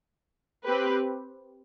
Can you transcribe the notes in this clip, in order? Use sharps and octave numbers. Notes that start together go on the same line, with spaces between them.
C4 G4 B4